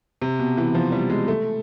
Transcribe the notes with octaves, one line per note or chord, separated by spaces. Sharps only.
C3
B2
E3
F3
G3
G#3
A3